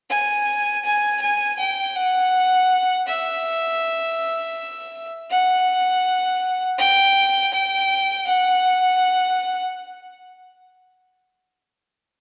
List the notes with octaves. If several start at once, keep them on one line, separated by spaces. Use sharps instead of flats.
G#5
G#5
G#5
G5
F#5
E5
F#5
G5
G5
F#5